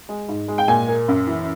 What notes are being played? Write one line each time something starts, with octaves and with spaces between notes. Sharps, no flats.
G#3
G#2
G#3
G5
A#2 G#5
A#3
F#2
E3